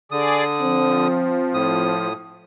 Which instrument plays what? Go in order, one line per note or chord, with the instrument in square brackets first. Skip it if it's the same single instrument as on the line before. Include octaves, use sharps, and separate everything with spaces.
[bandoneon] D3 D#6 [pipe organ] G#4 D5
[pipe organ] F3 [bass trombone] C4
[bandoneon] A2 D#6